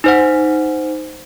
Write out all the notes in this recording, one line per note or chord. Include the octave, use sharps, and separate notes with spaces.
D#4 C5 F#5